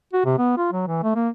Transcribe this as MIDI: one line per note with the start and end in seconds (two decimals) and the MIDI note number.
0.13 0.23 66
0.25 0.35 48
0.38 0.55 59
0.57 0.68 65
0.72 0.85 54
0.87 0.99 52
1.03 1.15 57
1.15 1.29 58